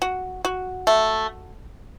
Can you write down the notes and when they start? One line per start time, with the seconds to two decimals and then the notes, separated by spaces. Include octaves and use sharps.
0.02 F#4
0.45 F#4
0.87 A3